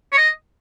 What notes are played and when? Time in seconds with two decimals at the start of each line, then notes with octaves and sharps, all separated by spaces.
0.12 C#5
0.17 D#5